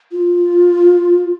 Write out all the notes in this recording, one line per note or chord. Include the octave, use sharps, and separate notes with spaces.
F4